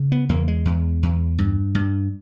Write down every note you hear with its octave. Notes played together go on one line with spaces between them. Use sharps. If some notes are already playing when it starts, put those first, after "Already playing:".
Already playing: C#3
B3
E2 A#3
G#3
E2
E2
G2
G2